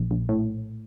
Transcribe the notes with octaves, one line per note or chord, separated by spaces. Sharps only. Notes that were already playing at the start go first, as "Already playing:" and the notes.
Already playing: A#1
A#1
A2